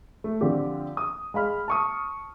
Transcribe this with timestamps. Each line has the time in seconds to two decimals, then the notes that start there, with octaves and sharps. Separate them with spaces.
0.24 A3
0.41 D3 F3 C4 D4 F4 G4
0.97 D#6
1.34 G#3 F5 B5 F6
1.68 A5 C#6 D#6